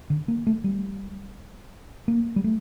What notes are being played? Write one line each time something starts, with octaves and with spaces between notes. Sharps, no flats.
D3
A#3
A3
G3
A#3
G3
A3